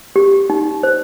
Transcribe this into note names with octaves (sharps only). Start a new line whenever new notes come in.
G4
D#4
C5